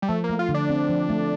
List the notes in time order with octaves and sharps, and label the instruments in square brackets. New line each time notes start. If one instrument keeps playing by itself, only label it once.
[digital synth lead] G3
[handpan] F3 [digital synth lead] A3
[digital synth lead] A#3
[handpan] A3
[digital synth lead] F4
[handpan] D3
[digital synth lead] D4
[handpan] C4
F3
A3